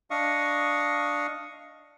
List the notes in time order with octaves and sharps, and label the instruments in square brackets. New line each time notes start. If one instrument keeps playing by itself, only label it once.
[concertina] D4 D#5 F5 C#6